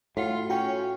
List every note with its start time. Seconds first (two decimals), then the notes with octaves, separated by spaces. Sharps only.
0.17 A2 F4 F#4 F#5 G5
0.50 C#4 F4 F#4 G5